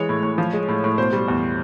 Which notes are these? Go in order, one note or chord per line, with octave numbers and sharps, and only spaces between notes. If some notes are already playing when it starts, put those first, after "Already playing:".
Already playing: E3 G#3 C#5
A2
A2
F3
G#3
A2
A2
B2 C5
G3
E2